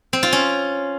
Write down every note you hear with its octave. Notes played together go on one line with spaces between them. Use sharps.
C4
F4
C#4